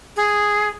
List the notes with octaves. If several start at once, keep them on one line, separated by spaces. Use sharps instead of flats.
G#4